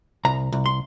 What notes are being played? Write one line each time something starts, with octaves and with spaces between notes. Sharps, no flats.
C2 A#5
C2
C6